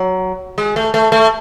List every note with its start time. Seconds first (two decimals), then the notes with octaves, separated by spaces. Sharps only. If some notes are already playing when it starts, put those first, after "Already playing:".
Already playing: F#3
0.58 G#3
0.76 A3
0.94 A3
1.12 A3